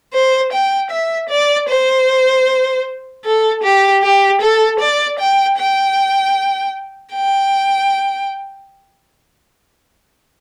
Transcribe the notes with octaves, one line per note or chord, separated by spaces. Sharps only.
C5
G5
E5
D5
C5
A4
G4
G4
A4
D5
G5
G5
G5